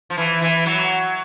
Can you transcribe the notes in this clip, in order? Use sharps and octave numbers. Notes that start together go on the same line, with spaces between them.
F3
E3
E3
F#3